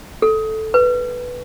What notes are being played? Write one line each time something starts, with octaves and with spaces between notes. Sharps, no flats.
A4
B4